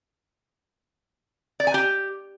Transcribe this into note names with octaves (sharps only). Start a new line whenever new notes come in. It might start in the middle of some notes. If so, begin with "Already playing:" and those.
D5
G#5
G4